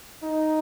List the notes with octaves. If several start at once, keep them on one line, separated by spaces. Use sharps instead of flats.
D#4